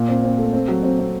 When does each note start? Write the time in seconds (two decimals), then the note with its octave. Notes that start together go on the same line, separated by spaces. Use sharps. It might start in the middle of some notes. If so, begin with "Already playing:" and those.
Already playing: A#2
0.09 C4
0.24 C4
0.38 A3
0.53 C4
0.68 F#3
0.83 C4
0.99 C4